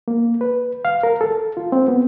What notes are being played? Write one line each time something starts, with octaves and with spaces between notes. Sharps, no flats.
A#3
B4
F5
A#4
A4
F4
C4
B3